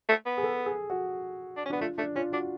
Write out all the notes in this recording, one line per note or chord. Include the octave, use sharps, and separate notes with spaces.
A3
B3
G#4
A4
G#4
F#4
D4
C#4
B3 D4
A3 F4
A3 D4
C#4 F4
D4 F#4